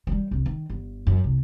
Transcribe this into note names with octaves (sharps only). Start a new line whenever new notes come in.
F#3 G3
C2 D4
D#3
G1
F#2
C2